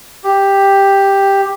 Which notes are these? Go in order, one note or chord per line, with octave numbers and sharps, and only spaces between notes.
G4